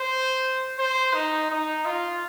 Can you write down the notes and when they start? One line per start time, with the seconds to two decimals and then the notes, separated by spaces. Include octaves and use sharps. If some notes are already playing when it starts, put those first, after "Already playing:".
Already playing: C5
0.79 C5
1.14 D#4
1.50 D#4
1.85 F4